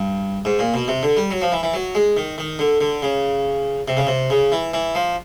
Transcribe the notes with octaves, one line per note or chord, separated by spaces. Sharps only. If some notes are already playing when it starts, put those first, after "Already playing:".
Already playing: G2
G#2
A#2
B2
C3
D3
G3
F#3
F3
E3
E3
F#3
G#3
D#3
D#3
D3
D3
C#3
C3
C#3
C3
C#3
E3
E3
F3